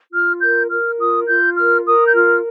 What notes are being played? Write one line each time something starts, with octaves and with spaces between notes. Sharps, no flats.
F4 F6
A#4 G6
A#4 F6
F4 D#6
F4 G6
A#4 F6
A#4 D#6
G6
F4 F6